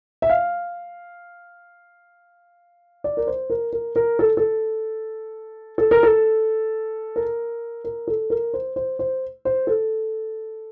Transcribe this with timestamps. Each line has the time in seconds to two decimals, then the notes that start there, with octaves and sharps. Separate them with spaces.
0.22 E5
0.30 F5
3.04 D5
3.17 A#4
3.27 C5
3.50 A#4
3.73 A#4
3.96 A#4
4.19 A4
4.37 A4
5.78 A4
5.91 A#4
6.03 A4
7.16 A#4
7.84 A#4
8.08 A4
8.30 A#4
8.54 C5
8.76 C5
8.99 C5
9.45 C5
9.67 A4